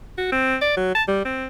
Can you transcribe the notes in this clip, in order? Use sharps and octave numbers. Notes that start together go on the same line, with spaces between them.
F#4
C4
D5
F#3
A5
G3
C4